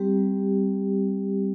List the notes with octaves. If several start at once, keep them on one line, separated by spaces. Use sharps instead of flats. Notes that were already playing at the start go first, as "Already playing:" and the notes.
Already playing: G3 C4 G4